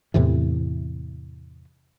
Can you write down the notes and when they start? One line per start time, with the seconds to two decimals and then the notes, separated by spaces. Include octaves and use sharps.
0.14 E2 A2 C3 E3